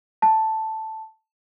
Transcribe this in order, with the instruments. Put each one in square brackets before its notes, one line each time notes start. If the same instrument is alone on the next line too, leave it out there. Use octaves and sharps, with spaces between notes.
[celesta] A5